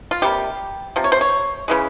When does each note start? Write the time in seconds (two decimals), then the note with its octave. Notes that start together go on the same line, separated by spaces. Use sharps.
0.11 F4
0.22 C3 G3 A#3 G4
0.96 C3 F3
1.04 C#5
1.12 C5
1.21 C#5
1.68 C#3 E3 G#3